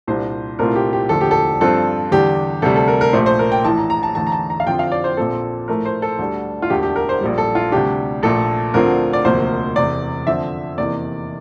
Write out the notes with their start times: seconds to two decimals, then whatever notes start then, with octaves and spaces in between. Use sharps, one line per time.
0.07 C2 A#2 G3 D4 C5
0.59 C2 A#2 A3 C4 F4 A#4
0.76 G4
0.93 G4
1.09 E1 D2 D3 F3 A4
1.21 G4
1.31 A4
1.61 G2 F3 C4 F4 A4
2.12 E2 D3 G3 G4
2.62 D2 C3 G3 A4
2.76 A4
2.88 A#4
3.01 A#4
3.13 A#1 A#2 A3 C5
3.26 C5
3.39 A#4
3.52 G5
3.64 A#1 A2 E3 A5
3.78 A#5
3.90 A#5
4.03 A5
4.15 E2 D3 A3 A5
4.27 A#5
4.32 A5
4.50 A#5
4.60 F5
4.66 F2 D3 F3 C4 F4 G5
4.79 F5
4.92 D5
5.04 C5
5.17 A#1 A#2 F3 C4 A4
5.68 A2 F3 A3 A#4
5.85 C5
6.02 A4
6.19 D2 D3 G3
6.62 F4
6.70 E1 D2 D3 A3 G4
6.83 G4
6.96 A#4
7.09 C5
7.21 A#1 A#2 G3
7.38 A4
7.55 F4
7.72 D2 C3 G3 D4 G4
8.23 A#1 A#2 A3 A4
8.74 D2 D3 F3 C4 F4 A#4
9.13 D5
9.25 E1 D2 C3 F3 A#3 C5
9.76 E1 E2 C3 D5
10.27 F2 D3 F3 C4 E5
10.78 F1 E2 C3 E3 A#3 D5